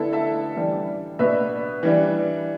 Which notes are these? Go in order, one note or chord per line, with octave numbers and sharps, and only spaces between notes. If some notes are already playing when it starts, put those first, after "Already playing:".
Already playing: D3 B3 D4 E4 A4
E5 A5
E3 G3 D4
B2 B3 D4 B4 E5
E3 G3 D4